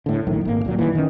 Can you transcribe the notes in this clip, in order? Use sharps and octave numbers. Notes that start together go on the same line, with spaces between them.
A2 D3
A#1 F#2 A2 D#3
G#1 A#3
D1 A#2 F#3
F#2 A#2 D#3 E3
D#3 C#4